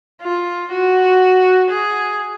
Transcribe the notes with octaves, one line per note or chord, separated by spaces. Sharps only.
F4
F#4
G#4